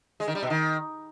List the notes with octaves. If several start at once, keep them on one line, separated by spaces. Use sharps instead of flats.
G#3
D#3
G3
B2
D#3